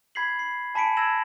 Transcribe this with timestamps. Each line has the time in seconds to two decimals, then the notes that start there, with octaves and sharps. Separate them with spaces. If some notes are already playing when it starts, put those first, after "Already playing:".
0.15 B5 G#6 B6 C7 F#7
0.39 C7
0.75 G#5 A5 B5 B6 C#7 D7
0.97 E6 G#6 A#6 E7 F#7